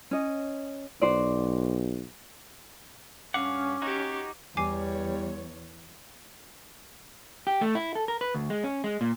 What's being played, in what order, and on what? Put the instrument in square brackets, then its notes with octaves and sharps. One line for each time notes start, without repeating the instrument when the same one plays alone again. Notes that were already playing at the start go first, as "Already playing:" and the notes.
[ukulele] C#4 D#5
[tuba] B1 [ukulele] F#4 C5 D5
[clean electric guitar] G2 F5 F#5 [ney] C#4 [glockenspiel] D6
[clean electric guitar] D#4 F#4 [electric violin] G4 C#5
[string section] E2 C#5 [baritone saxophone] G3 [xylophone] G#5 D6 C7
[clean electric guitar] G4
A3
E4
A4
A#4
B4
D2
G#3
C#4
G#3
A#2